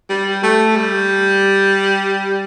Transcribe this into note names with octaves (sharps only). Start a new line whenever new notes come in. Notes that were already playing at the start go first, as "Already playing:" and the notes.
G3
A3
G3